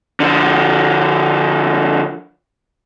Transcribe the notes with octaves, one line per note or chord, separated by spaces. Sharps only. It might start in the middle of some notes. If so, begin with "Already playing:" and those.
D3 F3